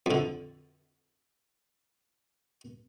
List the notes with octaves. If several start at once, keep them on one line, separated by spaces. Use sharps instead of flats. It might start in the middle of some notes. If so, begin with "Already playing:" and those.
F2 D3